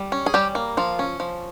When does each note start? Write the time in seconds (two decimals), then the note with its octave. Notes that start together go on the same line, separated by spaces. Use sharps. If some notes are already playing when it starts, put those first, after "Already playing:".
Already playing: G3
0.12 C#4
0.26 G#4
0.34 G3 G4
0.55 A#3
0.77 F3 F4
0.99 C#4
1.20 F3